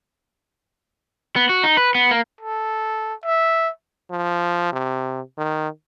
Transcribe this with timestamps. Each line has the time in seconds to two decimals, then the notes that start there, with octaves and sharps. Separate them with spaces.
1.36 B3
1.49 F#4
1.64 D#4
1.77 B4
1.95 B3
2.11 A#3
2.41 A4
3.24 E5
4.11 F3
4.73 C3
5.38 D#3